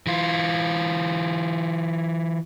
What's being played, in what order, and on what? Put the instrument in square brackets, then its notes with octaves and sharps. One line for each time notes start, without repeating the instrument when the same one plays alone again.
[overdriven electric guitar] E3 F4